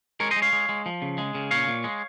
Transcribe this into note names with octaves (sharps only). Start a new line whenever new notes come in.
G#3 A#4 C#5
C5 D#5
G#3
C#5 F5
G#3
G#3
F3
C#3
G#3
C#3
A#2 C#5 F5
A#2
G#3